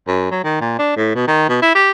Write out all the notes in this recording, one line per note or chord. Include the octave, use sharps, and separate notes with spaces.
F#2
F#3
D#3
A#2
D4
A2
B2
D#3
B2
E4
G4